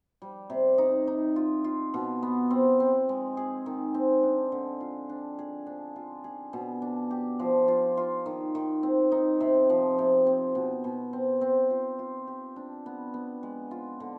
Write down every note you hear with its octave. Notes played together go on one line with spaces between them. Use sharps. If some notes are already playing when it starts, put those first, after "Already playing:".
G3
C3
D#4
D#4
F4
F4
B2
B3
C4
C4
G#3
G#4
D#3
C4
D4
D3
F4
D4
G#4
D4
F4
G#4
B2
D4
G4
F3
F4
F4
D#3
D#3
C4
D#4
C3
F3
C3
C4
B2
B2
C4
C4
F4
F4
G4
D4
B3
B3
G#3
F4
D3